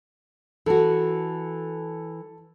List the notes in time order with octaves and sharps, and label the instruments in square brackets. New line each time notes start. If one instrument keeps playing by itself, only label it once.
[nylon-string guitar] E3 F#4 [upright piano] A4